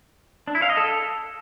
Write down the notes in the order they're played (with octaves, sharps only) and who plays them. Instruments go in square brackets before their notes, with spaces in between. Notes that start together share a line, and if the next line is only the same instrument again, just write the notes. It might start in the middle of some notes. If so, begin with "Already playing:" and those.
[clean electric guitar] D4
E4
F5
D#5
A4